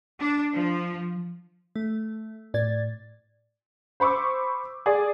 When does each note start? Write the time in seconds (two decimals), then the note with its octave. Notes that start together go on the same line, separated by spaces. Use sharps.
0.20 D4
0.52 F3
1.75 A3
2.54 A2 D5 G#6 A6
4.00 C5 B5 C#6 D6 E6
4.86 G#4 D5